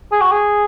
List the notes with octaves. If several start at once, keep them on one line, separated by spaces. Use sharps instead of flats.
G#4
F#4
G#4